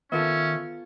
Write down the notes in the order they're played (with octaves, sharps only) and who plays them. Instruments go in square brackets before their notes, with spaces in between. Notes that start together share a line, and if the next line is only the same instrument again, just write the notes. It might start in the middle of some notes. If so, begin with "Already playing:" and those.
[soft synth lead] D#3 [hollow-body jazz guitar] B3 F4 A4 [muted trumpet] C#4 [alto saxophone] E5